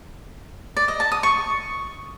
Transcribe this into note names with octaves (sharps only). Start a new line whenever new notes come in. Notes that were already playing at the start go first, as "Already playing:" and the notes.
D5
D#5
A5
D#6
C#6